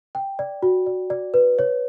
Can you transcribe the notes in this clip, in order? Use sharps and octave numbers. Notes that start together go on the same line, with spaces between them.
G5
D5
F#4
D5
D5
B4
C#5